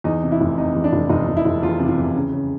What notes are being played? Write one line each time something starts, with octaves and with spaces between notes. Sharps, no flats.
E2 D#4
C3
E4
F1
C3 D#4
E2
D4
F1
F1 D#4
F1
E4
F1
E2 F4
C3
F4
E2
C#3
C#3